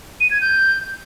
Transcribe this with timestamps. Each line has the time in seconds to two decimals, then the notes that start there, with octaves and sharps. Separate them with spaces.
0.20 D#7
0.31 G#6
0.41 G6